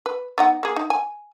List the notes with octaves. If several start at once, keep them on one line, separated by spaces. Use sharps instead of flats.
B4
B3 D#4 F#5
A#3 G#4
D#4
G#5